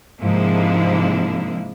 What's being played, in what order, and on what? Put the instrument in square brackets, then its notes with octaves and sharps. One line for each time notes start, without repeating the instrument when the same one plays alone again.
[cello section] G#2 C3 F3 A#3 D4 E4